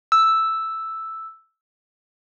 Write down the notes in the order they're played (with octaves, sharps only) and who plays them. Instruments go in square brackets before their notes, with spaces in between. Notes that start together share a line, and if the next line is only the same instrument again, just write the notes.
[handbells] E6